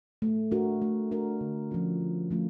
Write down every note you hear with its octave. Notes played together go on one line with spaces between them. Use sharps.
A3
D4 F#4 A#4
A3
D4 F#4 A#4
D3
F3 A3 C#4 F4
D3
F3 A3 C#4 F4